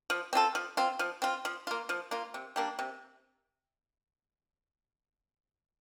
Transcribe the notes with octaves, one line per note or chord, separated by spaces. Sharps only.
F3
C4 F4 A4
F3
C4 F4
F3
C4 F4
F3
A#3 F4
F3
A#3 F4
C3
G3 A#3 D4
C3